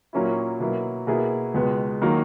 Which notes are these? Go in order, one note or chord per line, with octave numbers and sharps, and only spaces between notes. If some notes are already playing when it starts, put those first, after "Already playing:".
A#2 F#3 A#3 C#4 E4
B2 F#3 A#3 E4
B2 A#3 E4 G#4
C#2 B2 G#3 B3
D#3 F#3 A#3